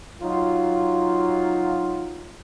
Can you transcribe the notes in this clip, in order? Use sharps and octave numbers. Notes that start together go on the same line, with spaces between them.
F#3 D#4 F4